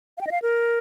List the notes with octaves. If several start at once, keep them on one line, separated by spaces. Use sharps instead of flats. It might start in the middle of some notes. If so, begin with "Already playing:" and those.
F5
G5
D#5
F5
A#4